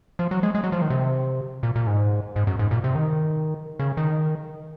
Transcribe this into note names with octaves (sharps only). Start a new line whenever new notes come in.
F3
F#3
G#3
G#3
F#3
F3
D#3
C3
A#2
A#2
G#2
G#2
F#2
G#2
A#2
C3
D#3
C#3
D#3